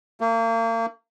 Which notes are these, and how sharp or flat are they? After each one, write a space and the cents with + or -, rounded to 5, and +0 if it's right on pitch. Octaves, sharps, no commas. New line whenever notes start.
A#3 -35